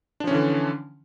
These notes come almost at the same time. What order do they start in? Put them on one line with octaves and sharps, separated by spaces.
D4 F3 C#4 E3 D3